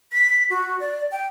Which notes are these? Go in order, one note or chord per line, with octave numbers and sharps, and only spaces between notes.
B6
F#4
D5
G5